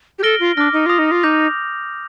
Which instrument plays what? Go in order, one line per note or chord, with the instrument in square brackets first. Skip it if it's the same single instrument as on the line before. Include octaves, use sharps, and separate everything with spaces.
[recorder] G4
[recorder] A4 [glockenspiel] F6 A#6 D7 G7
[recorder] F4
[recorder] D4 [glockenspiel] D6 F6 A#6
[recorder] D#4
[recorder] F4 [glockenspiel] D#6 A#6 F7
[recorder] D#4
F4
[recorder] D#4 [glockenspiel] D6 G6 A#6 F7